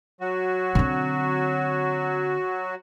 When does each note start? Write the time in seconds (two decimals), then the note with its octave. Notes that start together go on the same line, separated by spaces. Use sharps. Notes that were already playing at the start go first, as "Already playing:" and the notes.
0.21 F#3 F#4
0.75 D3 C4